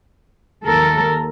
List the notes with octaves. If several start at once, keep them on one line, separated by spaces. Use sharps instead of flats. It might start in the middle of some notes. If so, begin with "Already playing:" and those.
D#2 A4 A#4